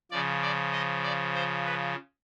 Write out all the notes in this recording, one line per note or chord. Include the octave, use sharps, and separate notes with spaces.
C#3 F3 D5
D5
D#5
D5
C5
B4